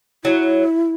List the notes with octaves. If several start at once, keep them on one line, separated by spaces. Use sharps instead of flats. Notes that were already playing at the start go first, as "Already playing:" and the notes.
F#3 E4